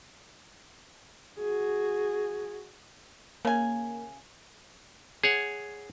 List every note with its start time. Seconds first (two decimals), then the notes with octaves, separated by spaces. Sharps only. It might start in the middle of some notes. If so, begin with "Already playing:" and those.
1.38 F#4 G#4
3.45 C#3 A#3 G#5
5.24 G#4 C#5 F#5